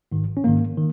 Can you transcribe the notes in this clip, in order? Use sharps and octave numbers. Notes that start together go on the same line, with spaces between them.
G#1 G#2 D#3
C#4
G#1 G#2 D#3 A#3
D#3